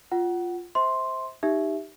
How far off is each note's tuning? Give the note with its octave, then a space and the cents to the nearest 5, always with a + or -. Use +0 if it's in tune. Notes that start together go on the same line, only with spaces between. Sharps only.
F4 +0 F#5 +20
C5 +0 E5 -35 C6 +0
D#4 +0 G4 +0 E5 +0